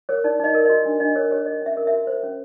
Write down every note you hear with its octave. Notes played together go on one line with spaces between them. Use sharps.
A#4 C#5
D#4 D5
D#4 D#5
A#4
F#4 D#5
D4
D4 D#5
A#4 C#5
G4 C#5
C#5 D#5
C#4 E5
A#4
F#4 E5
C5
C#4